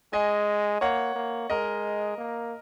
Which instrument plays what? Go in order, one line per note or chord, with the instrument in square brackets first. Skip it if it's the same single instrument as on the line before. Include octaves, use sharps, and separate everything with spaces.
[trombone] G#3 [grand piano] D#5 G#5
[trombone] A#3 [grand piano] C#5 F#5
[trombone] A#3
[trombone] G#3 [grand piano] A#4 D#5
[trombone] A#3